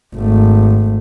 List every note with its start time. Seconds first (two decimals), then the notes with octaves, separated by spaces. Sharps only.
0.16 G#1 A3